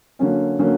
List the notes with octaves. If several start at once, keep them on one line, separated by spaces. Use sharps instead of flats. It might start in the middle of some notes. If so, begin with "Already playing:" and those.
D3 F#3 A#3 C#4
D3 F#3 A#3 C#4